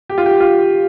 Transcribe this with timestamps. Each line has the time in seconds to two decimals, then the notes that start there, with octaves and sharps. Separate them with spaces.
0.10 G4
0.18 F4
0.26 G4
0.40 F4